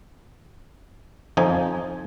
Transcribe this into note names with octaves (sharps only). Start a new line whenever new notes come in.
F2 F3 D#4 G#5